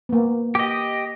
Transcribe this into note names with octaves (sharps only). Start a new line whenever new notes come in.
A#3 B3
G4 D#5